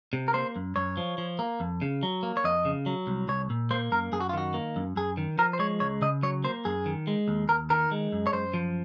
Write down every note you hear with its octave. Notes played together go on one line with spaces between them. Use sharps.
C3
A#4
A#3 C5
F#2
F#2 C#5
F3
F3
A#3
F2
C#3
F#3
A#3
C#5
F2 D#5
C#3
F#3
C2
C2 C#5
A#2
A#3 C5
F#2 A#4
F#2 G#4
F#4
F4
D#3 F#4
A#3
F#2
F#2 G#4
D#3
F3 A#4
C5
G#3 C#5
C#2 C#5
C#3 D#5
F#3 C#5
A#3 C5
F#2 G#4
D#3
G#3
D#2
D#2 A#4
D#3 A#4
G#3
F#2
C#5
F#2 C5
F3